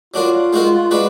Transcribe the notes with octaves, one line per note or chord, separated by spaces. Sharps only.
F#3 D4 F4 F#4 A#4
G#3 D#4 F#4 A#4
G#3 D4 F#4 B4